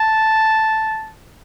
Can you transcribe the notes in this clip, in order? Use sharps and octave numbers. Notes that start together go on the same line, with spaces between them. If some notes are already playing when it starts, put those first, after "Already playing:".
Already playing: A5